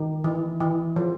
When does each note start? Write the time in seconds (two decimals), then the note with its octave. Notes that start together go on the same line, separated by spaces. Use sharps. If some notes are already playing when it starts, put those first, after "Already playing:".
Already playing: D#3
0.24 E3
0.60 E3
0.96 F3